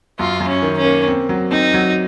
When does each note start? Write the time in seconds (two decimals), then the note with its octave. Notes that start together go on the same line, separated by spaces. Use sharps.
0.19 F#2 F4
0.40 F#2
0.48 C#4
0.62 D#3
0.78 C#4
0.84 A#3
1.07 C4
1.29 F#3
1.51 C4 D#4
1.74 F#3